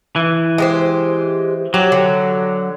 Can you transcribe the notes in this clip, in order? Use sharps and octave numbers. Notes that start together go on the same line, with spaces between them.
E3
G#3 G4 C5
F#3 G4
D3